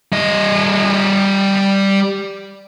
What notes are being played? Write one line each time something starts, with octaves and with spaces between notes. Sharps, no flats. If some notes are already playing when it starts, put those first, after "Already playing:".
G3 D#5